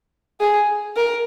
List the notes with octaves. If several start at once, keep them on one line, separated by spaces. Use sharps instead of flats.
G#4
A#4